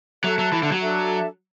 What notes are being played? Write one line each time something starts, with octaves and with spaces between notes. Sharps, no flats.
F#3 A4 E5 A5
F#3
E3
D3
F#3
D4 A4 E5 A5